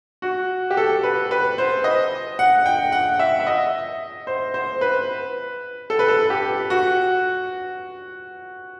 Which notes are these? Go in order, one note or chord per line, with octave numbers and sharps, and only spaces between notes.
F#4
G4
A4
B4
B4
C5
D#5
F#5
G5
F#5
E5
E5
D#5
C5
C5
B4
A4
B4
A4
G4
F#4